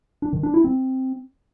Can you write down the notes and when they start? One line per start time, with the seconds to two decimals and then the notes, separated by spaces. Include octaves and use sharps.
0.22 D4
0.33 D#3
0.43 D4
0.54 E4
0.64 C4